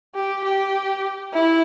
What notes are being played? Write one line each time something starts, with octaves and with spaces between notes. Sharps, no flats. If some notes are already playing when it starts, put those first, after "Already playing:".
G4
G4
E4